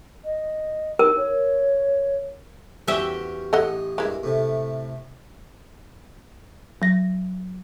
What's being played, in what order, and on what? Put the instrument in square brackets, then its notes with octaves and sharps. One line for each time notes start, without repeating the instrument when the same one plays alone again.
[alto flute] D#5
[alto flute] D#4 [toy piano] A#4
[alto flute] C#5
[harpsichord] E2 C#4 F#4 [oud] G4 B4 E5
[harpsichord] A1 D#4 [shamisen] A4 D#5 F#5
[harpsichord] G2 A#3 [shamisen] G#3 E4
[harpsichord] A2 C3 A3
[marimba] F#3 A#6